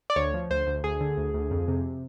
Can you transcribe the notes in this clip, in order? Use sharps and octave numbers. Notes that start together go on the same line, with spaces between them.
D5
D2 C#5
F3
D2 C5
D2
D2 G#4
D3
D2
D2
F2
C3